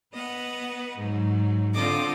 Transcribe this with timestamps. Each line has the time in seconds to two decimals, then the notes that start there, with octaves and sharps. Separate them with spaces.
0.11 B3 B4 D#5 F#5
0.96 G#2 F#3
1.73 D3 C4 F4 A4 D#5 D6